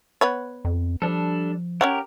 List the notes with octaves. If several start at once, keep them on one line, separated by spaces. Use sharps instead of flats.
B3 B4 C#5
F2
F3 G3 D4 A4
C#4 G4 A#4 C#5 F#5